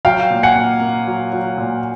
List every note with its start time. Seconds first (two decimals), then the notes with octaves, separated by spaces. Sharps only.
0.05 F#3 F5 G5
0.30 A#2
0.43 F#5 G#5
0.56 A#3
0.81 A#3
1.07 F#3
1.33 F#3
1.57 A#2